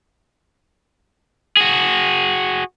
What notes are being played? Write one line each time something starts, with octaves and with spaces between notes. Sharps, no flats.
F#4 G#4